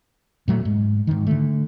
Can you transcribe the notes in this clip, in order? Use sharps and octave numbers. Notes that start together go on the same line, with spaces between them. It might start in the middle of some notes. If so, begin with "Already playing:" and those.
A#2 F#3 A3
G#2
G#2 D#3
D3 A3